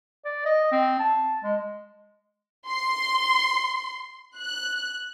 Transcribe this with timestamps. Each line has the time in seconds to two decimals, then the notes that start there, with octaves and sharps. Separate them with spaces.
0.25 D5
0.46 D#5
0.72 C4
0.99 A5
1.43 G#3
2.69 C6
4.39 F#6